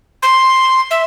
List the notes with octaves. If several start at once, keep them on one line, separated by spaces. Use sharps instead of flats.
C6
E5